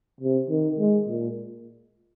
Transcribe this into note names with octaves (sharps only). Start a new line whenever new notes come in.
C3
D#3
G#3
A#2